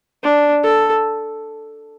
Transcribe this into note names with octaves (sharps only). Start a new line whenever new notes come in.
D4
A4